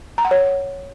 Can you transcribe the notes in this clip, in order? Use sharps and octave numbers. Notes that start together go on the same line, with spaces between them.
A#5
F#5
C#5